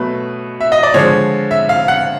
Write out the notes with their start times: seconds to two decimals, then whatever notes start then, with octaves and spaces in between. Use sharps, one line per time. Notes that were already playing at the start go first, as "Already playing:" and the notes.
Already playing: B2 F#3 A3 B4
0.61 E5
0.72 D#5
0.83 D5
0.94 D3 F3 G#3 C#5
1.51 E5
1.69 F5
1.88 F#5